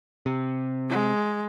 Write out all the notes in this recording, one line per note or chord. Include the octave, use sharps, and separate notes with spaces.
C3
G#3